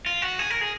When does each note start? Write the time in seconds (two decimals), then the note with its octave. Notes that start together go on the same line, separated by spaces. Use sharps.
0.06 F4
0.22 F#4
0.39 G#4
0.50 A#4
0.61 G#4